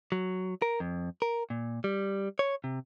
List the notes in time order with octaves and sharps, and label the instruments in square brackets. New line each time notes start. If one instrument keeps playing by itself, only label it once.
[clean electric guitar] F#3
A#4
F2
A#4
A#2
G3
C#5
C3